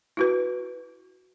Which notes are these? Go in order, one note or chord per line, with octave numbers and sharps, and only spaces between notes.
E4 F#4 B4